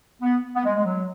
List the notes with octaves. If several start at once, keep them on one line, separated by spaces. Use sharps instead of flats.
B3
B3
G#3
G#3
F#3